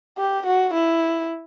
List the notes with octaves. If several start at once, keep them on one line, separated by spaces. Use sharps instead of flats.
G4
F#4
E4